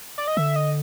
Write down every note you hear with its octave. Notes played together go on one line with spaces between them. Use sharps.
D5
D#5
D3 E5
D#5